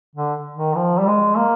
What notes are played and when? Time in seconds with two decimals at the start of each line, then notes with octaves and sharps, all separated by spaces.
0.15 D3
0.56 D#3
0.76 F3
1.00 G3
1.07 G#3
1.37 A#3